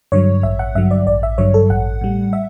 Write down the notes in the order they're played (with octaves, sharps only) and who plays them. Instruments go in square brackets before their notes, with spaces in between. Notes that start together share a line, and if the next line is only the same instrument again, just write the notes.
[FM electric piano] G2 D3 F#3 C#5
A1 E5
F#5
G2 D3 F#3 E5
D5
A1 D5
E5
G2 D3 F#3 C#5
A4
A1 F#5
A2 G3
E5